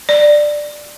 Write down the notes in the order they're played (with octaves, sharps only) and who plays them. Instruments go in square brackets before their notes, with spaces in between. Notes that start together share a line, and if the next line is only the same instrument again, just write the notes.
[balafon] D5